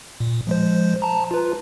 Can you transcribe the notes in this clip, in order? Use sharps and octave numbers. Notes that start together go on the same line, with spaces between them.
A#2
F3 G#3 C5
A5 A#5
F4 B4